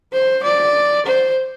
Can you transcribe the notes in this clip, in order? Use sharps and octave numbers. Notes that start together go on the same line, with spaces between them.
C5
D5
C5